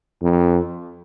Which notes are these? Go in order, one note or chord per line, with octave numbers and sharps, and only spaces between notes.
F2